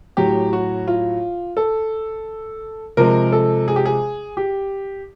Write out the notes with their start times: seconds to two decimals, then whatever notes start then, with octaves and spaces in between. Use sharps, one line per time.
0.17 A2 F#3 G4
0.53 F#4
0.88 F4
1.57 A4
2.97 C3 F3 G#3 A#4
3.32 A4
3.68 G#4
3.76 G4
3.85 G#4
4.37 G4